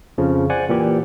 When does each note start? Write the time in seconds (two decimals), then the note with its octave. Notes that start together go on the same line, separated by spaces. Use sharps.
0.18 F2 C#3 F3
0.50 C5 D5 F#5 G#5
0.69 A#2 E3 G4